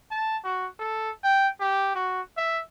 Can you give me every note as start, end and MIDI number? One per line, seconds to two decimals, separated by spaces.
0.11 0.37 81
0.44 0.67 66
0.79 1.10 69
1.23 1.48 79
1.60 1.94 67
1.95 2.21 66
2.37 2.59 76